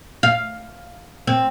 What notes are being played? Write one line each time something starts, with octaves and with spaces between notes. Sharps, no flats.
F5
C4